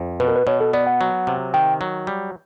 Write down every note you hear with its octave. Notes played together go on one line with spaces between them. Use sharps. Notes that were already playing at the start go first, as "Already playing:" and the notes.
Already playing: F2
B2 B4
A#4
B4
B2 C#5
A4
B3 D5
F#5
F#3
C3
D#3 G5
F#3
G3